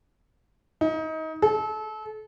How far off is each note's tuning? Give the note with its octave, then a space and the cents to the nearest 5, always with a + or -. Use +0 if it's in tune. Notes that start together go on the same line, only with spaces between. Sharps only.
D#4 +30
A4 -30